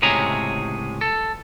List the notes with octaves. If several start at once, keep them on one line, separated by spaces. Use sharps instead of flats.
C#2 A2 C3 G#4 C#5 A#5
A4